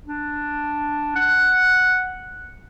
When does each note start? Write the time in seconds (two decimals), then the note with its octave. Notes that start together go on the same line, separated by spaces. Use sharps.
0.07 D4
1.16 F#5